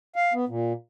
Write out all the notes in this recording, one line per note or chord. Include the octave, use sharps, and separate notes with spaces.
F5
B3
A#2